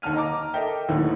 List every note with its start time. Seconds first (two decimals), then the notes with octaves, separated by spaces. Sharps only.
0.02 D#2 D3 A5 F6 D#7
0.15 D#5 A#5 D6
0.54 A4 A#4 D#5 E5 G5
0.88 D#1 D#2 A2 D3 E3